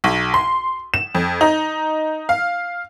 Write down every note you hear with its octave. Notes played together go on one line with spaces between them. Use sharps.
B1
C6
E7
F2
D#4
F5